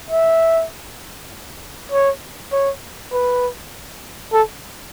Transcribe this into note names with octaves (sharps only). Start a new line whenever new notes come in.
E5
C#5
C#5
B4
A4